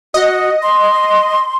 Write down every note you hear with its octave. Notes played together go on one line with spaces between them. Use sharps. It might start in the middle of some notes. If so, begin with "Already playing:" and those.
F#4 D#5
C6